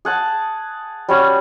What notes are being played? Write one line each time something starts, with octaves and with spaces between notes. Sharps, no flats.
G#4 F#5 A5
G3 C#4 F#4